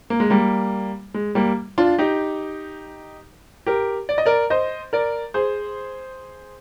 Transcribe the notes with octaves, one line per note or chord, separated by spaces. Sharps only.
A#3
G#3
G3 A#3
G#3
G3 A#3
D4 F4
D#4 G4
G4 A#4
D5
D#5
A#4 D5
C5 D#5
A#4 D5
G#4 C5